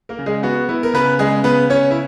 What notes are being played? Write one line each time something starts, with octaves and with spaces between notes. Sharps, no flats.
A#3 A#4
C#3
G#3 G#4
B3 F#4
B3 E4
A#4
C#3 B3 B4
C#3 G#3 G#4
C#3 B3 B4
C#3 C#4 C#5
E4